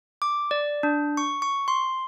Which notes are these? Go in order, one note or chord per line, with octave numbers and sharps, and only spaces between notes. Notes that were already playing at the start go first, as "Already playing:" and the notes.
D6
D5
D4
C#6
C#6
C6